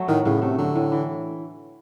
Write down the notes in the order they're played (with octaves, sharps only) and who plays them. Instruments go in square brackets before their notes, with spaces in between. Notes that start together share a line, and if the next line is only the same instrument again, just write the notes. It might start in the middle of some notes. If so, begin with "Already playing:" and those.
Already playing: [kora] F#3 A3
[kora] A2 [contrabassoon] D#3
[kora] A2 [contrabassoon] C#3
[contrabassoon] C3 [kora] A3
[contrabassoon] D3 [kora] F#3
[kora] A2
E3